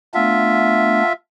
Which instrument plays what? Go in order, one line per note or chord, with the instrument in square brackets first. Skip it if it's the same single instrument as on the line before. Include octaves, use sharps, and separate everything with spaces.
[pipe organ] A3 B3 D4 [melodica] F4 E5